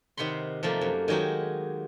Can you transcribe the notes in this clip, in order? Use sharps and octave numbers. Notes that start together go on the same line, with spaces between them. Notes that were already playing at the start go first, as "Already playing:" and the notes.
C3 D#3 F#5 B5 C6
C3 F3 A3 A#3
F#2
D#3 F#3 G#3 F#4 G4